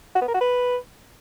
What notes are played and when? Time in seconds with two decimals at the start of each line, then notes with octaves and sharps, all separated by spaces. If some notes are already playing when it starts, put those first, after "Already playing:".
0.15 F#4
0.21 B3
0.28 A#4
0.34 F#4
0.40 B4